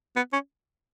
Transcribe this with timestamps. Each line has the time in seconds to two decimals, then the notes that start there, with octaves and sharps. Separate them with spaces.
0.16 B3
0.33 C#4